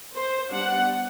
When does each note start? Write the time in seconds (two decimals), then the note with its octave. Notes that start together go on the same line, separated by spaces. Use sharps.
0.14 C5
0.50 G3 B3 D4 F#5